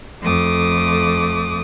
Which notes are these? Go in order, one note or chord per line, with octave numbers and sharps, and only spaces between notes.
F2 A3 D6 D#6